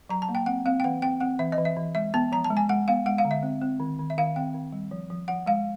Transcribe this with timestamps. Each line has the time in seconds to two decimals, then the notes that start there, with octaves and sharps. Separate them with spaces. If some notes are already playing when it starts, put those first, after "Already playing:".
0.09 F#3 A#5
0.22 A5
0.29 A#3
0.35 G5
0.46 C4 F#5
0.66 C4 F5
0.80 G5
0.84 E3 F#5
1.02 C4 G5
1.20 C4 F#5
1.39 E3 E5
1.52 D#5
1.58 E3
1.65 E5
1.76 E3
1.95 G#3 E5
2.14 B3 A5
2.32 F3 A#5
2.44 A5
2.50 G#3
2.57 G#5
2.69 G#3 F#5
2.88 B3 F5
3.06 G#3 F#5
3.18 F5
3.25 D3
3.31 E5
3.43 C4
3.62 C4
3.80 D#3
3.99 D#3
4.10 E5
4.18 D#3 F5
4.36 C4 G5
4.54 D#3
4.72 G3
4.91 F3
5.10 F3
5.28 F3 F#5
5.46 G#3 F5